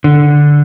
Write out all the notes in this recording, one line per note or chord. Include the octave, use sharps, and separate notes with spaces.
D3